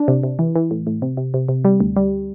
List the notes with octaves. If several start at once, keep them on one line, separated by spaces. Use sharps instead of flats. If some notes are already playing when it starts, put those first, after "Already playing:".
Already playing: D4
C3
C3
E3
E3
A2
A2
C3
C3
C3
C3
G3
D2
G3